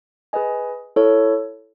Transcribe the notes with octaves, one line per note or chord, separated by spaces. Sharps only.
G#4 B4 D#5 G#5
E4 A4 C#5